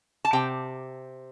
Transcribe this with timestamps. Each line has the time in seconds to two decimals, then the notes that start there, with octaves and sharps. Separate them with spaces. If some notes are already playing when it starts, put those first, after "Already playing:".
0.25 A5
0.33 C3 G5